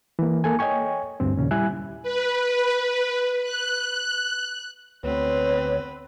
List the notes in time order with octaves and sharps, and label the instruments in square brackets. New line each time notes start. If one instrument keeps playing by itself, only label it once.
[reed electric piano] E3 A#3
A#3 A4 G#5
C#5 D#5 G5 G#5 C#6
D2 G2 C4
D#2 A#2 C#3 C#4
G3 E4 E5 G#5 F#6
[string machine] B4
F#6
[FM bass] D2 [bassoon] B3 [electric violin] C4 B4 [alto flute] C#5